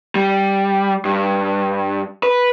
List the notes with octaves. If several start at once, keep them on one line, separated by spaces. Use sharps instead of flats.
G3
G2
B4